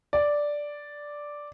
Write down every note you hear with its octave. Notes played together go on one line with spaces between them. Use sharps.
D5